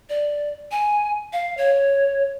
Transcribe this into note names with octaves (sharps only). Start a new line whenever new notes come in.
D5
G#5
F5
C#5